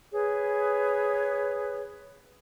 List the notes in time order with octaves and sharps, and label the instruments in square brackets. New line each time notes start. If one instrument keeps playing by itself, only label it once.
[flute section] G#4 B4 C#5